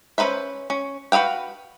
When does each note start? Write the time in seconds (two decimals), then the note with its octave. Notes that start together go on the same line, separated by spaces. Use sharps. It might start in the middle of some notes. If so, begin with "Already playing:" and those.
0.18 C#4 D#4 B4 C5 E5
0.70 C#4
1.12 F#4 B4 E5 F5 G5